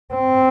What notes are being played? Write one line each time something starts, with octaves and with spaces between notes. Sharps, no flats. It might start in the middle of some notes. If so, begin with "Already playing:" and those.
C4